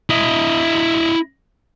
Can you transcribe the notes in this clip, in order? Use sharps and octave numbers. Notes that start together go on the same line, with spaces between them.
E4 D#5